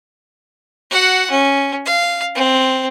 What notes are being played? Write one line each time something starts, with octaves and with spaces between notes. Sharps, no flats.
F#4 F#5
C#4
F5
C4